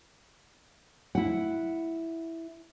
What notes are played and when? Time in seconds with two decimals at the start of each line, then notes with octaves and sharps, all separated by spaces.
1.15 E4 F#5